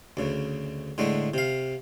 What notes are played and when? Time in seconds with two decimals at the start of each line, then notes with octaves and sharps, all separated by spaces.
0.17 D2 C#3
0.98 A2 D3 G#3 A3
1.34 C3 F5